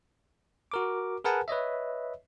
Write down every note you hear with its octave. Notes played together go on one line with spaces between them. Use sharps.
F#4 A#4 D6
G#4 A#4 B4 F#5 G#5 A5
B4 C#5 D#5 E5